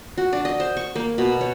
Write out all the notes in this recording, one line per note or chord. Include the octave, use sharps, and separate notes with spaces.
F#4
D4
D#5
C5
C#6
A#3
B2
C#5